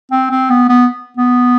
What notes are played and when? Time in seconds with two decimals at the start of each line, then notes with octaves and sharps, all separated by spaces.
0.11 C4
0.31 C4
0.50 B3
0.69 B3
1.17 B3